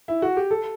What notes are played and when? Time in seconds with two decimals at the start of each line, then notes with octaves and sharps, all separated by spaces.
0.08 E4
0.22 F#4
0.37 G4
0.51 A4